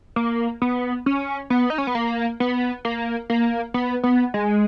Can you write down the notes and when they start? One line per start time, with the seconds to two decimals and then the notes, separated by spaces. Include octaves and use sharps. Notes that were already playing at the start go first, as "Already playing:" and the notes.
0.16 A#3
0.62 B3
1.06 C#4
1.50 B3
1.70 D#4
1.78 C#4
1.87 B3
1.95 A#3
2.40 B3
2.85 A#3
3.30 A#3
3.74 B3
4.04 B3
4.34 G#3